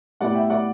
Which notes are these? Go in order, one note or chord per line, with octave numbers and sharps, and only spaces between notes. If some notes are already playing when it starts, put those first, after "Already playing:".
A2 G3 B3 D5 F#5
E5 G5
D5 F#5